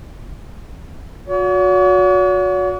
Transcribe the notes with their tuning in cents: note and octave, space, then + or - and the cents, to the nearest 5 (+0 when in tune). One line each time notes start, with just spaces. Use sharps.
F#4 -30 C#5 +45